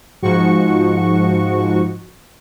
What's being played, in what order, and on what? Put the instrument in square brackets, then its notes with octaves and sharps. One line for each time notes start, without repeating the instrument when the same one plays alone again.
[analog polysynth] G#2 F3 F#4 C#6